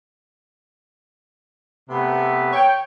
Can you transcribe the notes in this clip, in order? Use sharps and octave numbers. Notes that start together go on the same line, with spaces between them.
C3 A3 B3
C#5 G5